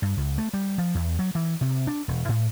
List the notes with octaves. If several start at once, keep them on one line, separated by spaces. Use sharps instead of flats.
G2
C#2
A3
G3
F3
E2
F#3
E3
C3
D4
E1
A2